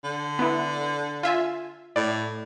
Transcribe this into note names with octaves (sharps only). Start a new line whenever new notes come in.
D3
B3 E4
F4 E5 G#5
A2 D5